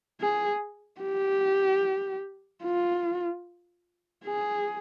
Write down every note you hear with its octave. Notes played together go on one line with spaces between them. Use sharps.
G#4
G4
F4
G#4